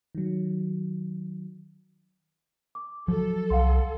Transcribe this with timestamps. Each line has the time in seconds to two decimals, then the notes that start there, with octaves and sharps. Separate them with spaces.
0.15 D#3 F#3
2.75 D6
3.08 F3 F#3 A4
3.50 C2 F5 F#5 C6